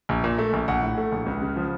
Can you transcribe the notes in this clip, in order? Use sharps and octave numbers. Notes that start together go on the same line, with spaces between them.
A#1
A#2
A3
A#1
A#1 F#5
A2
A3
A#1
C#2
C#3
F3